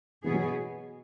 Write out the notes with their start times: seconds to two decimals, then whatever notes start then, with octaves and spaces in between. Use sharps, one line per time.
0.24 B2 E3 B3 G#4
0.34 F#3